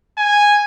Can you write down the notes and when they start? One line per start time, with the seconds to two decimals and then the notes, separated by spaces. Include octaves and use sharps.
0.18 G#5